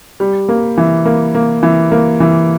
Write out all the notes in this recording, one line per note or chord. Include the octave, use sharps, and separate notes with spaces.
G3
A#3
E3
A#3
A#3
E3
A#3
E3